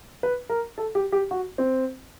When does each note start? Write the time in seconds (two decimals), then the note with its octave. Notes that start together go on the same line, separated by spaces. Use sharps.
0.23 B4
0.49 A#4
0.78 A4
0.95 G4
1.12 G4
1.31 F#4
1.58 C4